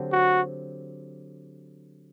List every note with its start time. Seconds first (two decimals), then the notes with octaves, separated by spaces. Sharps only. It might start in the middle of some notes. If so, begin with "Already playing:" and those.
Already playing: D3 F#3 C4 G4 C5
0.12 F#4